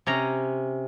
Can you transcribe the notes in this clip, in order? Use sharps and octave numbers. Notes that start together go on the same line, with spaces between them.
C3 C#4 A#5